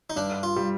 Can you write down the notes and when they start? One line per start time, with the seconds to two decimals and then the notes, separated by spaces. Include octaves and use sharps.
0.10 D#4
0.16 G2 D4
0.43 F4
0.56 G3